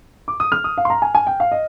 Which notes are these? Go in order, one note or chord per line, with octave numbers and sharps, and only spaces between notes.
D6
D#6
F6
D#6
F5
C6
A#5
G#5
G#5
G5
F5
D#5